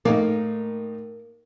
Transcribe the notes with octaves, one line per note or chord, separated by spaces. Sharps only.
A2 A#3 D#4